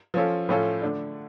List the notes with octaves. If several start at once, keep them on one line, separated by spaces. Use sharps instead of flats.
F3 C#4 F4 A4
A2 F3 C#4 F4 A4
D3 A3 D4